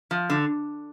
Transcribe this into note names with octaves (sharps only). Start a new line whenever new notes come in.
F3
D3